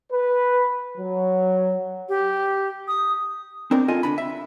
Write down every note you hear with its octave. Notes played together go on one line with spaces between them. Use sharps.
B4
F#3
G4
D#6
C4 D4 D#4 A#4
F4 A4 D#5 G#5
D3 D4 B5
E5